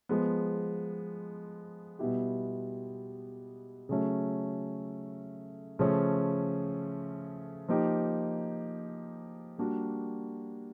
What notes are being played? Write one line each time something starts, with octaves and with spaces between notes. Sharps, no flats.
F3 G#3 B3
B2 G3 B3 E4 G4
C#3 F#3 A3 C#4
C#3 F3 A3 C#4
F3 A#3 D#4 G4
G3 A#3 D4 F#4